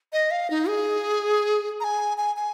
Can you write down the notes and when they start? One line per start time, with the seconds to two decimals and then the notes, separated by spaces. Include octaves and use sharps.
0.13 D#5
0.31 F5
0.50 D#4
0.68 G#4
1.80 A#5
1.84 G#5
2.18 G#5
2.37 G#5